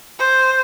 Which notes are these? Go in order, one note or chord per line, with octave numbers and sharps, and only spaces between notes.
C5